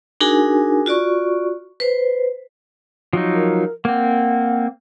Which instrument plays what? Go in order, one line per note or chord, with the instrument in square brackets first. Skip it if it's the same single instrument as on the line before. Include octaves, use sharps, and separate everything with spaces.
[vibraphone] D4 D#4 F#4 G#4 A#4 G#5
F4 F#4 D5 C#6
B4 C5
[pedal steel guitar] F3 F#3 D#4
[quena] A#4
[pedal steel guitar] A#3 C4 [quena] F#5